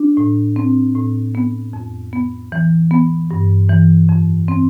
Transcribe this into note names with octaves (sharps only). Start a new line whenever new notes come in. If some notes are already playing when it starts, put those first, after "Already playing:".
Already playing: D4
A2
C4
A2
B3
F2
B3
E3
B3
G2
E3
F2
C4